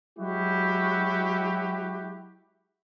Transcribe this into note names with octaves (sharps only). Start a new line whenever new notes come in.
F#3 G#3 E4 F#4 G4